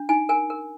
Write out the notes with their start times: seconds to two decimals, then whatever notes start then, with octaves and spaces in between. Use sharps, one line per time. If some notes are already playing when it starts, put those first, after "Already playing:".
Already playing: D4
0.09 D#4 G#5
0.29 A#4 G#5
0.50 A#4